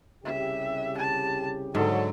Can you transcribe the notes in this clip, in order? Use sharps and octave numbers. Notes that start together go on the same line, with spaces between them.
C2 C#3 G4 E5
A5
G#2 D3 F#3 A4